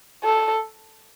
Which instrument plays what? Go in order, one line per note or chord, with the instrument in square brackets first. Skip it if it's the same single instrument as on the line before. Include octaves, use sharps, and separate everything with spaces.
[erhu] A4